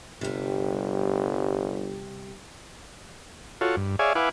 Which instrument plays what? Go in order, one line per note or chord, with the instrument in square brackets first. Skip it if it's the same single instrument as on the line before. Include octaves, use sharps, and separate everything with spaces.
[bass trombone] G1 [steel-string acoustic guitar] C3 G3
[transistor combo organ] F4 F#4 A4 C#5
G2
G#4 C#5 D5 E5 F5 G#5
E4 B4 F5 F#5 G#5 D6